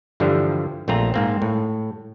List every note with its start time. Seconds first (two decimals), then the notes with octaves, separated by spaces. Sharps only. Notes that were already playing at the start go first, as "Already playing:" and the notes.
0.20 G2 D3 E3 F3 G3
0.88 A#1 A3 C4 F4 A#5
1.14 G#2 A#3 C4
1.42 A2